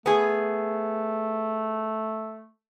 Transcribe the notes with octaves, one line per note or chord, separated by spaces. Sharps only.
A3 B3 G#4